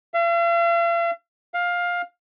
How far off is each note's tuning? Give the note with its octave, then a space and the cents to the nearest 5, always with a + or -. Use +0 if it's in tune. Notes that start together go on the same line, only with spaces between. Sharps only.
F5 -45
F5 +15